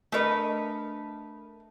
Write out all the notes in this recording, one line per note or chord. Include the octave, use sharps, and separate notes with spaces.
A3 D4 A#4 B4 D#5